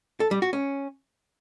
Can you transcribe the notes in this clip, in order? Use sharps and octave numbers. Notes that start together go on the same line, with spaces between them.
A4
G3
F#4
C#4